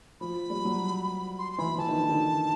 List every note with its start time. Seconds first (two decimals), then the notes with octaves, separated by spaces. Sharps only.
0.21 F3 B5
0.50 G3
0.65 F#3
1.38 C6
1.53 C6
1.58 E3 B5
1.78 E3 A5
1.89 D#3
1.99 D3
2.09 D#3